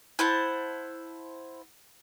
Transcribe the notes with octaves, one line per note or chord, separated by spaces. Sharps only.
E4 C5 F#5 A5